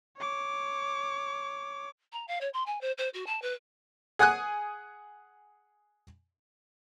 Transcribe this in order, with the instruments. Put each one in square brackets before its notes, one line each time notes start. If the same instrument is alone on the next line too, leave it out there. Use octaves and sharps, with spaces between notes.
[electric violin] C#5 D6
[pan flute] A#5
F5
C#5
C6
G#5
C5
C5
F#4
A5
B4
[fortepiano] G#4 F#5 G#5 D#6 F#6